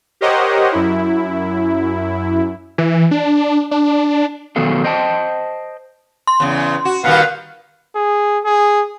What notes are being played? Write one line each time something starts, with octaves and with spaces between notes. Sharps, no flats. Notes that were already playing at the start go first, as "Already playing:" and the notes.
G4 A#4 C5 C#5 D#5 F#5
F#2 E4
E3
D4
D4
B2 D#3 F#3 B3 A4 F5
C5 D#5 G5 A5
C6
E2 C#3
F#4
A#2 D#3 G3 B4 F5 F#5
G#4
G#4